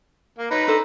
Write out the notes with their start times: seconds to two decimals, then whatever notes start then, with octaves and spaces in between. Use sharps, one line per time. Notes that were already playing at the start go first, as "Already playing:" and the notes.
0.38 A#3
0.51 D#4 B4 C#5 A#5
0.68 D4 A4 C5